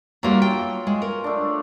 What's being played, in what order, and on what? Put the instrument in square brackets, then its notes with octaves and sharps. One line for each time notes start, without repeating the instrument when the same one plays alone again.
[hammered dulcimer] F#3 F4 [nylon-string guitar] G3 A#3 D4
[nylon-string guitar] G5
G#3
A#4
[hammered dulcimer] A3 D4